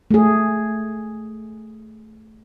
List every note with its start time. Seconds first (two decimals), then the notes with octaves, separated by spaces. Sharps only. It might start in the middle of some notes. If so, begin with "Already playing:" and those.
0.11 A3 G#4